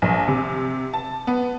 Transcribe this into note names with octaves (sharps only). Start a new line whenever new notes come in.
A#1
C3
A5
B3